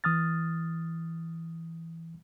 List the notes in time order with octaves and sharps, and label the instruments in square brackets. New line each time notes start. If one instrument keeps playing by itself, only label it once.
[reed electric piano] E3 D#6 F6 A6